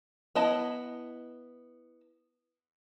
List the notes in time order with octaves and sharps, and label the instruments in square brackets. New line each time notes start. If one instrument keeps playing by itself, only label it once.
[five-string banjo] B3 E4 D#5 A5